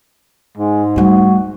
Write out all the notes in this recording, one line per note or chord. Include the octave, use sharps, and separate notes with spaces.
G#2 G#3
G3 A3 F#4